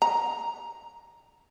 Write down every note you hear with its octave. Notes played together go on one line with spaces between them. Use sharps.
A#5